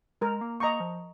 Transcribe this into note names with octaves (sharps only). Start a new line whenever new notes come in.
G#3 A#4
A#3
A#3 D#5 A#5 C#6
F3